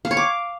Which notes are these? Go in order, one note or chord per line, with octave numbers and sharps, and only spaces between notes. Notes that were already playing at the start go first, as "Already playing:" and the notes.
F5
C#5
D6